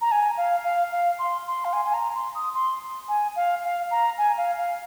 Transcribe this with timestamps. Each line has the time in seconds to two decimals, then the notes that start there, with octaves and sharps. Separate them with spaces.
0.01 A#5
0.11 G#5
0.37 F5
0.64 F5
0.92 F5
1.19 C6
1.47 C6
1.65 F5
1.73 G#5
1.85 G#5
1.94 A#5
2.15 C6
2.35 D#6
2.54 C6
3.08 G#5
3.36 F5
3.64 F5
3.91 A#5
4.18 G#5
4.37 F5
4.57 F5